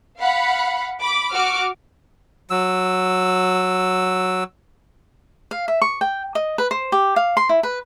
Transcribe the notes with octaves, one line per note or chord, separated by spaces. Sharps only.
F5 F#5 B5
B5 D6
F#4 D6 F6
F#3 E6
F5
E5
C#6
G5
D#5
B4
C5
G4
F5
C6
E4
B4